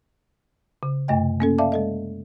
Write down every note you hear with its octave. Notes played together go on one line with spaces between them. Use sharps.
C#3
F#2 C3 A3 D#5 G5
A#3 C#4 A4
D5 E5 F5 A5 D6
G#3 A4 D#5